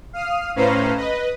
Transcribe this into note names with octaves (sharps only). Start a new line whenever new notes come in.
F5 D#6 F6
A2 C#4 B4 C5 F5 A#5
B4 D#5